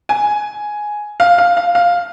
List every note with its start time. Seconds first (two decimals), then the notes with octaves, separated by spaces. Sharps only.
0.09 G#5
1.20 F5
1.38 F5
1.57 F5
1.75 F5